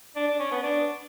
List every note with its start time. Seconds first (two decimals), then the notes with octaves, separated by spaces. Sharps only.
0.16 D4
0.28 D4
0.39 C#4
0.51 B3
0.63 D4